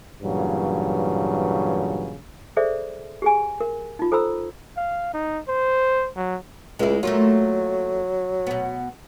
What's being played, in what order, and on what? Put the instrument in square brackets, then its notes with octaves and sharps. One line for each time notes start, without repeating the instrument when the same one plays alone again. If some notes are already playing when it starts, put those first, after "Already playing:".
[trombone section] G2 A#2 C#3 E3 F#3
[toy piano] G#4 A4 C5 D5 E5
G4 G#4 G#5
A#4
D#4 F4
A4 C5 A#5 B5 E6
[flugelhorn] F5
D#4
C5
F#3
[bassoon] C#2 [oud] G#3 E4
[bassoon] F#3 [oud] A3 A#3 F4
[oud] B2 B3